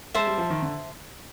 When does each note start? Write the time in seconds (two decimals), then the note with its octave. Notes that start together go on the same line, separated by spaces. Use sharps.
0.15 G#3 C5 E5 A5
0.27 G3
0.38 F3
0.50 D#3
0.62 D3